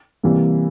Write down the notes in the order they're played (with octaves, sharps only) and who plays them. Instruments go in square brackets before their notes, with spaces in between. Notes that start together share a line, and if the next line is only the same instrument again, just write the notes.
[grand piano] C3 E3 G3 A#3